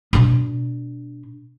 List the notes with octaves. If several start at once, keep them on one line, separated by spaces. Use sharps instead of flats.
B2 D4